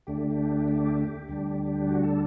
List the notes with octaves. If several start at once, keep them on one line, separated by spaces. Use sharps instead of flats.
D2 D3 A3 D4 G4
G4
D2 D3 G3 D4
F#4
A4